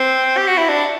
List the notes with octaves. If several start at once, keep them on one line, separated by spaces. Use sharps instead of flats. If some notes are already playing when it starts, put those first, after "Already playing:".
Already playing: C4
G4
F#4
E4
D4